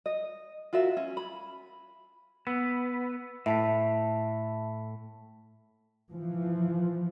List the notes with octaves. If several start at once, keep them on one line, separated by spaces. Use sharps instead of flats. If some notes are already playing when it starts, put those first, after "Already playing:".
D#5
F4 F#4 A#4 E5
C#4
B5
B3 E6
A2 E5 A5 B6
E3 F3